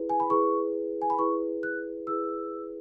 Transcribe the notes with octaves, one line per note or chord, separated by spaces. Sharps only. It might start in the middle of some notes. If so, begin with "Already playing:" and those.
Already playing: E4 G#4 B4
G#5
B5
E4 G#4 B4 C#6
G#5
B5
E4 G#4 B4 C#6
F#6
E4 G#4 B4 E6